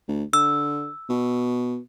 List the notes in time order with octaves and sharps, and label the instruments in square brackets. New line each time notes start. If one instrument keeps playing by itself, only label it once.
[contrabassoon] D2
[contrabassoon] D3 [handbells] E6
[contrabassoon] B2